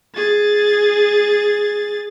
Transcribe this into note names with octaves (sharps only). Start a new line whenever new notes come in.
G#4 A6